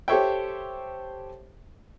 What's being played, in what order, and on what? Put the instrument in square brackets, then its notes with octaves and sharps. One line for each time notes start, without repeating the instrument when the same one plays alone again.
[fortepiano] G4 A4 C5 C#5 E5 G5